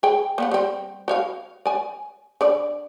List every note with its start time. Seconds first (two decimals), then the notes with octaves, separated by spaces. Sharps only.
0.03 G#4 G5
0.38 A#3 B3 F#5
0.51 G3 C4
1.08 F#4 C#5 F5
1.66 D5 G#5
2.41 D3 D5